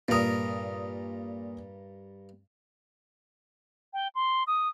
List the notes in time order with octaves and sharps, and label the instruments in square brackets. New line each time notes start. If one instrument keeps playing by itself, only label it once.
[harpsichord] G2 A#4 [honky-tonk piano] A#2 D#6
[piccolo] G5
C6
D#6